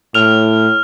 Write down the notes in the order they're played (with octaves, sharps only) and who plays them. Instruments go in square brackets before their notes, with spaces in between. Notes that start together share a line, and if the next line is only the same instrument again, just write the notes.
[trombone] A2 [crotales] F6 F7